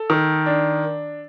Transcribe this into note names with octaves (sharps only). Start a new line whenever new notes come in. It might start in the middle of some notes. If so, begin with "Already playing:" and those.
Already playing: A4
D#3
D4